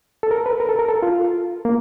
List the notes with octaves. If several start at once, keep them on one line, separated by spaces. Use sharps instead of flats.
A4
A#4
B4
A#4
A4
A#4
A4
F4
A#3